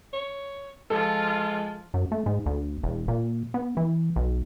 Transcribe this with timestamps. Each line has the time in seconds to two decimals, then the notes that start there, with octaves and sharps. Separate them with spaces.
0.13 C#5
0.90 F3 G#3 F4 A4
1.94 F#2
2.12 A3
2.26 G#2
2.46 D2
2.83 E1
3.08 A#2
3.54 B3
3.77 E3
4.16 B1